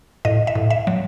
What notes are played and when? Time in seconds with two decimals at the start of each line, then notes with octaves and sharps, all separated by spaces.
0.25 A2 D#5
0.47 E5
0.55 A2
0.71 E5
0.87 F#3